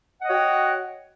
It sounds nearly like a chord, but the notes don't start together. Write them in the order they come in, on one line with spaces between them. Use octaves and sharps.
F#5 D#5 C#5 F#4 G5